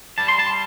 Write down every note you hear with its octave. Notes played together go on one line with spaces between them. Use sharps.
G3 A5
C6
A5